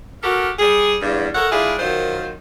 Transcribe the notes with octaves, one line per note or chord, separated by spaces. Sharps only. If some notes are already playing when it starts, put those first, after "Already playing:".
F#4 G4 A4 A#4
G3 G#4
E2 G2
A4 A#4 C#5 E5 F#5
G3 D4 E4 F4 G#4
F#2 D#3 F4 C5